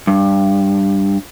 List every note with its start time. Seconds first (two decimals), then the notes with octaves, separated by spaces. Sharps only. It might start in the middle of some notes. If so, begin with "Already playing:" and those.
0.07 G2